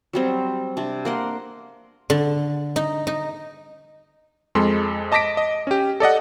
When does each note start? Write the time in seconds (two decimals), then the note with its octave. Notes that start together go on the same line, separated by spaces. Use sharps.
0.13 F#3 G3 C4
0.77 C3 D4
1.05 A#3 F#5 C6
2.10 D3
2.76 D#4
3.07 D#4
4.55 F2 G#3 A4 C6
5.12 D#5 A5 D6 A#6 B6 D7
5.37 D#5
5.67 C#4 G4
6.00 A4 D5 D#5 F#5